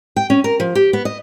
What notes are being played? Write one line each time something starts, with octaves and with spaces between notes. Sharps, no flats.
G5
C#4
A#4
F3
G4
B3
D#5